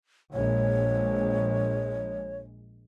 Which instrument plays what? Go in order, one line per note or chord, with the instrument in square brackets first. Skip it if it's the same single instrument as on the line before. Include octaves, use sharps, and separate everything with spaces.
[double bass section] A#1 G#3 [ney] C#5